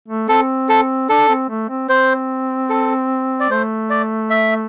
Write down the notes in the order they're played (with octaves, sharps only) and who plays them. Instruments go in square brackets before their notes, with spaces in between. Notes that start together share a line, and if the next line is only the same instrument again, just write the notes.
[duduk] A3
[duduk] C4 [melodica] A4
[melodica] A4
[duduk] D4 [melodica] A4
[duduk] C4
A3
C4
[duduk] C4 [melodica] C5
[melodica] A4
D5
[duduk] A3 [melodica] C5
[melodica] D5
E5